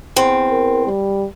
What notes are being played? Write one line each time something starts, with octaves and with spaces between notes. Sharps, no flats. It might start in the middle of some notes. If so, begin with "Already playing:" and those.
E2 C4
A#4
G3